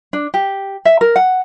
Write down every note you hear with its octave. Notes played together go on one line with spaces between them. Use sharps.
D4
G4
E5
A#4
F#5